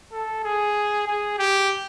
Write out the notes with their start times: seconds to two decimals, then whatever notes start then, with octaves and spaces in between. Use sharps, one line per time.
0.12 A4
0.44 G#4
1.07 G#4
1.39 G4